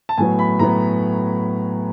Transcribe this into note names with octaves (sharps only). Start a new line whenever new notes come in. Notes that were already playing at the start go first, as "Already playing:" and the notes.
A5
A2 F#3 B3 G#5
B5
A2 F#3 B3 A#5